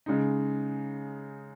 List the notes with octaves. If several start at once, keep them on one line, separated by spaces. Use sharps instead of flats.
C#3 G#3 D#4